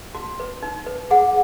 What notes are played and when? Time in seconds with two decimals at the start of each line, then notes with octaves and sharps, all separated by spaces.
0.15 F#4
0.40 B4
0.63 D#4
0.86 B4
1.11 G#4 F#5